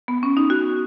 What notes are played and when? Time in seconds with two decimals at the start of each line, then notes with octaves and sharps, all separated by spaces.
0.08 B3
0.23 C#4
0.37 D#4
0.50 F#4